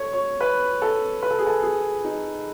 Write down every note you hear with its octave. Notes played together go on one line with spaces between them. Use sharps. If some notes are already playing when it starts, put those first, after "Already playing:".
Already playing: A4 C#5
C#5
B4
A4
B4
A4
G#4
A4
G#4
D#4